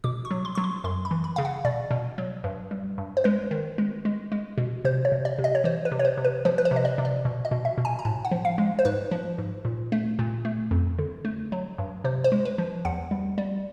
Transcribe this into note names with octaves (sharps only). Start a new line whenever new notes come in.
B2 D6
C#6
F#3
C6
F#3 C#6
C6
F#2 C6
B5
E3
B5
C#3 F5
F#5
B2 D5
B2
F#3
G2
G3
G2
C5
G#3 B4
D#3
G#3
G#3
G#3
B2
C3 C5
C#5
C3
D5
C3
D#5
C#5
E3 C5
B4
C3
C#5
C5
C3
B4
F3 C5
B4
C5
C3
D#5
D5
C3
D5
B2
D#5
B2
E5
B2
G#5
A#5
A2 A5
F#5
F3
F5
G#3
C5
G#2 B4
F3
G#2
A#2
A3
A#2
A3
F2
D3
A3
F#3
G2
C3 C5
C5
G#3
B4
F3
E2 F#5
G3
G3